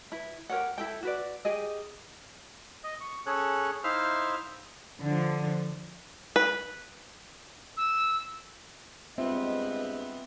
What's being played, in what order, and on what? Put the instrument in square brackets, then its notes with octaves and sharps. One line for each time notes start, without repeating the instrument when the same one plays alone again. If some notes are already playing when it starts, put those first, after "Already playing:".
[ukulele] E4 B4
G4 A#4 C#5 F#5
E4 A4 G5
F#4 B4 D5
G4 G#4 D#5
[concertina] D#5
C#6
C#4 G#4 A4 C#5 F#6
D#4 E4 C5 E5 F5 F6
[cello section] D3 F3
[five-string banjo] B4
[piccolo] E6
[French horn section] G2 G#3 D#5 [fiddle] B3 [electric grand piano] C4 F4 [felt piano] E5